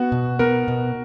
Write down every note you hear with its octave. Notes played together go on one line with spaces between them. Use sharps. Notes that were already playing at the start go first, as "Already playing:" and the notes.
Already playing: B3 F#4
B2
B3 A#4
B2